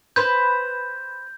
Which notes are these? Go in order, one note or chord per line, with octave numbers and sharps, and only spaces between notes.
B4 C5 G6